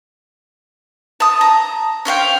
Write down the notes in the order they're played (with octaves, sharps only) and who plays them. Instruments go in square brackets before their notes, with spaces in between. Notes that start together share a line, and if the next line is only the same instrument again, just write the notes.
[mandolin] A5 D#6
A#5
C#4 C5 F5 G5